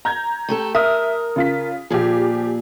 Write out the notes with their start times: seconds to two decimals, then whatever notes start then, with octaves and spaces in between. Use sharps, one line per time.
0.05 A#5 G6 G#6
0.49 A3 G4 A4
0.75 A#4 E5 D#6 F6
1.36 C#3 F4 B6
1.90 A#2 F3 G4 G#4